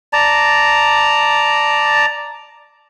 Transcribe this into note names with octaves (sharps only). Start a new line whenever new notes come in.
D5 A5 A#5